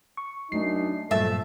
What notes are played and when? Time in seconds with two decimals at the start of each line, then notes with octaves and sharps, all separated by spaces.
0.17 C#6
0.52 F#2 A3 D4 D#4 C7
1.11 G2 A#2 F3 F#3 A3 E5 A5